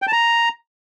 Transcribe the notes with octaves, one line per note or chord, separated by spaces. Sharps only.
G5
A5
A#5